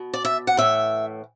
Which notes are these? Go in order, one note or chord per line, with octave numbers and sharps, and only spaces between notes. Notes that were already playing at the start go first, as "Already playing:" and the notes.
Already playing: B2
D5
E5
F#5
A2 E3 E5